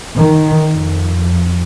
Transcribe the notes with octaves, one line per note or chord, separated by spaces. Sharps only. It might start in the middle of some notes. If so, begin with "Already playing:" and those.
D#3
F2